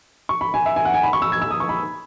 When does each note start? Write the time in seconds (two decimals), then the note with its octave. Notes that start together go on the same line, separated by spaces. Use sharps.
0.29 C#6
0.41 B5
0.54 G#5
0.66 E5
0.76 G#5
0.85 F#5
0.94 G#5
1.03 B5
1.13 C#6
1.22 E6
1.32 G#6
1.42 E6
1.51 D#6
1.60 C#6
1.69 B5